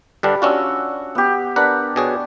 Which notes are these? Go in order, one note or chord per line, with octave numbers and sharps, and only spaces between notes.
G2 D3 G3 D4
C#4 D4 F4 F#4 E6
B3 G4
D4 A#4 B4 F#5
B2 G#4 C#5